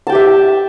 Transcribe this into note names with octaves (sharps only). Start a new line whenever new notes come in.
G4 E5 G5 A5